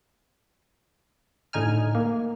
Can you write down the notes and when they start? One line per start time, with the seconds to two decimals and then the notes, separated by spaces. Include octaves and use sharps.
1.53 A2 D3 D#4 G#5 F6
1.95 A#3